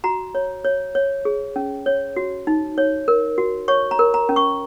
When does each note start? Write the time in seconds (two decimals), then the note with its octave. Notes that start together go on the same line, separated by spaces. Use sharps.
0.04 F#4 A#5
0.35 C#5
0.65 C#5
0.95 C#5
1.25 G#4
1.56 C#4
1.86 C#5
2.16 F#4
2.47 D#4
2.78 C#5
3.08 A#4
3.38 F#4
3.68 C#5 C#6
3.91 A#5
3.99 A#4
4.14 A#5
4.29 C#4
4.36 C#6